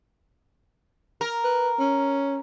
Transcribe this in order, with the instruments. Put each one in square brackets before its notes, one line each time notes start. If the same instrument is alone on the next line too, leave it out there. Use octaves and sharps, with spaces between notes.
[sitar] A#4
[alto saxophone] B4
C#4